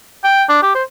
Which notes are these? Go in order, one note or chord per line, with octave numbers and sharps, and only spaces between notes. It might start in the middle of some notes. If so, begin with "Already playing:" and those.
G5
D4
G4
C5